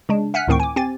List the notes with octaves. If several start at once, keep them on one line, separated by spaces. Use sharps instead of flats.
C#3 G#3 D4
E5 F#5 G#5 F6 F#6 B6
D2 A2 D#3 C4 G5 C#6
G#5 D6
C4 G4 G#5 A6